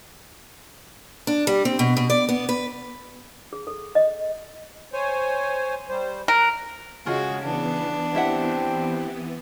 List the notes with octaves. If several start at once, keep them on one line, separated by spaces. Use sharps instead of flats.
D4
G3
C4
B2
B2
D5
B3
B4
G#4
A4
D#5
C5 C#5 G#5
G3 C5
A#4 F#6
C#3 G#3 F4 F#4 G#4
C#3 E3 B3 D4
C4 E4 G4 E5 F#5